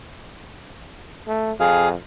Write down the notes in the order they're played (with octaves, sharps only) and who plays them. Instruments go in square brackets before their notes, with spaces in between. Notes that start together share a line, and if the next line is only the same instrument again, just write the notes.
[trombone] A3
[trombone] F2 [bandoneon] G#4 F5